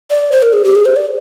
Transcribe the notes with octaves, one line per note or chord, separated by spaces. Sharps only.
D5
C5
A#4
G#4
G4
G#4
C5
D5